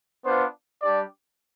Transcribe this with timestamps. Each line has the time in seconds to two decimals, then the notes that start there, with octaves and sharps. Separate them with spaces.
0.25 B3 D4 F4 C5
0.82 G3 D4 G4 D5